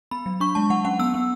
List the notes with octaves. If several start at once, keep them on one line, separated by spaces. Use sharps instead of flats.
B3 B5
F#3
D4 C#6
G#3 A5
F#3 F#5
C#4 F#5
B3 E6
B3